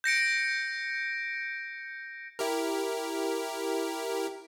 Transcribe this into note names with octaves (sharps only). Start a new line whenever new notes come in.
G6 A#6 C#7 D7
E4 G4 A#4